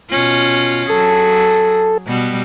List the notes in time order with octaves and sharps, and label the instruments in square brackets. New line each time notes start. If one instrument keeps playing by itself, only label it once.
[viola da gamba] B2 C#4 F4
[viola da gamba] F#3 G#4 [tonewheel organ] A4
[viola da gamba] B2 G3 B3